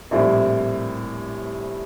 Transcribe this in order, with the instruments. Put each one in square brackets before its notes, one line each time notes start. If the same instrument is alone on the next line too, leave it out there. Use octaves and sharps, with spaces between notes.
[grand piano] A#1 A2 G3 C4 E4